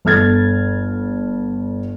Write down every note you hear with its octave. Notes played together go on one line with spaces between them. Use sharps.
G1 A4 F6 G#6 A6